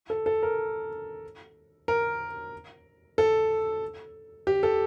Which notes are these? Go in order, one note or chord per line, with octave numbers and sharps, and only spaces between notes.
A4
A4
A#4
A#4
A4
G4
A4